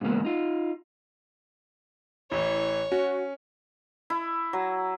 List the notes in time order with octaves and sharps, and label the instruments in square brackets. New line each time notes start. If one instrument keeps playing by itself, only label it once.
[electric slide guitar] G#2 C#3 E3 A#3 B3
D#4 F4
[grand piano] A1 E3 [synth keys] E4 [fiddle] C#5
[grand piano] C#4 [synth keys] F#4
[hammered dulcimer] E4
F#3